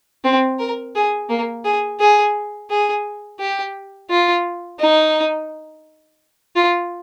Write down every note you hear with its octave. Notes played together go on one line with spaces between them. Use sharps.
C4
A#4
G#4
A#3
G#4
G#4
G#4
G4
F4
D#4
F4